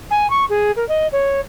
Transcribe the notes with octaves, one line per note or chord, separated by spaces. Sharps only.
G#5
C#6
G#4
A#4
D#5
C#5